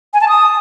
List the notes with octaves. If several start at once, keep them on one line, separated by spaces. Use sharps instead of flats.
G#5
A5
D#6